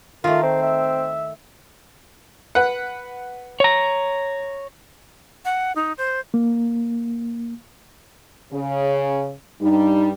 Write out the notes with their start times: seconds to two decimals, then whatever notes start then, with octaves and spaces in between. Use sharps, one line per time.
0.24 D#3 A3 F4 A#4
0.43 C4 C5
0.63 E5
2.55 B4 F#5
3.60 C#5 A#5
5.45 F#5
5.76 D#4
5.98 C5
6.34 A#3
8.52 C#3
9.61 G2 G3 D#4